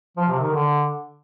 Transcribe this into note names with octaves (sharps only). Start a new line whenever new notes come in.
F3
C3
D#3
D3